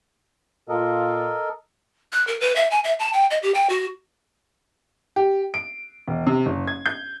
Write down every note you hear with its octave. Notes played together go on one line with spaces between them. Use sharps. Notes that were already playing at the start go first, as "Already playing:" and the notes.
A#2 F4 A4 A#4 D#5
F#6
A#4
B4
E5
G#5
E5
A5
G5
D#5
G4
G5
F#4
G4
D7
E1
C3
F#1
G#6
G6